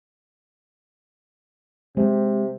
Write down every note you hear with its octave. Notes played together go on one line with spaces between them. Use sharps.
C3 G#3